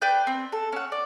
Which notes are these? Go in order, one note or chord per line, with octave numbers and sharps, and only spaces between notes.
D4 B4 G5 G6
C4
A4
C#4 F#5
D5